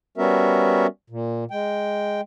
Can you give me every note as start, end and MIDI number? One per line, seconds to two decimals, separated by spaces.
0.18 0.87 55
0.18 0.87 59
0.18 0.87 61
0.18 0.87 66
0.18 0.87 70
0.18 0.87 76
1.10 1.44 46
1.51 2.21 56
1.51 2.21 79